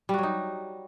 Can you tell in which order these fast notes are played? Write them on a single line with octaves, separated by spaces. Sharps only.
G3 F#4 F#3 D#4